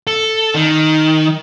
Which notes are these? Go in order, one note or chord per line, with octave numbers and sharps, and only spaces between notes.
A4
D#3